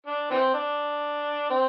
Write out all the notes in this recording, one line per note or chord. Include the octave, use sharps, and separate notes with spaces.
D4
E3 C4
D4
C4